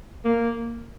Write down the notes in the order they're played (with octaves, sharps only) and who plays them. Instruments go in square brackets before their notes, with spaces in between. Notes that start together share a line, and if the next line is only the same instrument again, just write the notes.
[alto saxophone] A#3